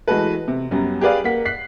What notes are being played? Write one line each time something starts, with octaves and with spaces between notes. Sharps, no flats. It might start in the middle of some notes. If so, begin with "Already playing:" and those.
E3 G#3 A3 F#4 A4 B4
C3
F#2 F#3 G3 B3 C#4
G4 G#4 B4 D5 F5
A#3 F#5 B6
F#6 B6 C7